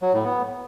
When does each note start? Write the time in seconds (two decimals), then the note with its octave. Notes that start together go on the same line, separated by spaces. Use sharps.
0.02 F#3
0.13 A2
0.24 B3